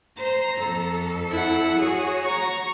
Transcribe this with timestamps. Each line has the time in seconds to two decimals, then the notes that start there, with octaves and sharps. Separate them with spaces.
0.19 C5 A#5
0.59 F2 A4
1.31 E4 F#5
1.79 F#4 G#4 C#5
2.25 A#5 C#6